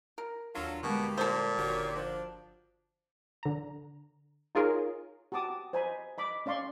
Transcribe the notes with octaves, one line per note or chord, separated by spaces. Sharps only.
A#4
D#2 F#3 D4 F4 A4 F6
B2 D3 G3 G#3 A#3 G4
A#2 A4 C5
G1 D3 D#3 F#4 G4 C#5
F3 D4
D3 A#5
D#4 F4 G#4 A#4 C#5
F#4 G4 A5 D6 D#6
C5 D#5 G#5 A#5 B5
D#5 B5 D6
C#4 D5 F5 C6 C#6